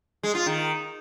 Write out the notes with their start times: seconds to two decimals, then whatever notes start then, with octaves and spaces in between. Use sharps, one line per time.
0.23 G#3
0.35 F4
0.46 D#3